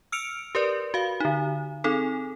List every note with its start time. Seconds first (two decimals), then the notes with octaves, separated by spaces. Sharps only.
0.12 E6 F6 C#7 D7 F7
0.55 G4 A#4 B4 D5
0.94 F#4 F5
1.20 D3 D#4
1.84 C4 D#4 G#4 A4